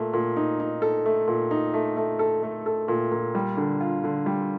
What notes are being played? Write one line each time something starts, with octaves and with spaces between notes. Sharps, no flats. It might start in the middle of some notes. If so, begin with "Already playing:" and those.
Already playing: A#2 A3
A#2
D#4
D#4
A4
A3
A#2
D#4
A3
A3
A4
A3
A4
A#2
A#2
G3
D3
F4
D3
G3